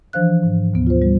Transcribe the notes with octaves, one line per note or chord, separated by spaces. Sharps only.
E3 F3 D4 C5 F5 F#6
G#2
D2 B2 B3
F4 C5
G3